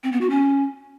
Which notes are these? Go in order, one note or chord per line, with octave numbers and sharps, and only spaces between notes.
C4
B3
F#4
C#4